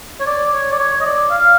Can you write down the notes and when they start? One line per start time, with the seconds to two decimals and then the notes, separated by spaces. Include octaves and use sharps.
0.20 C#5
0.26 D5
0.52 C#5
0.72 D5
0.79 C#5
1.00 D#5
1.05 D5
1.30 F5